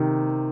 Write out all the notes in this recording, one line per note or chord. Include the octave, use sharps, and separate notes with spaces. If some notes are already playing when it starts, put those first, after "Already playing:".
Already playing: C3 D#3